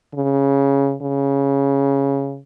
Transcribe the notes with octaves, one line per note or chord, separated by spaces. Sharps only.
C#3
C#3